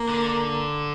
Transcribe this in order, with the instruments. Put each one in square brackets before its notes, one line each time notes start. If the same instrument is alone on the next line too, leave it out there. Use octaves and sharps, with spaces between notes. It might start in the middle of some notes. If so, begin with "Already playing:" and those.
Already playing: [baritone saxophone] A#3
[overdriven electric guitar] D3